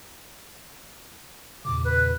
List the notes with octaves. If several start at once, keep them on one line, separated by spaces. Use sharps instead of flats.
E2 A#2 C#3 D6
B4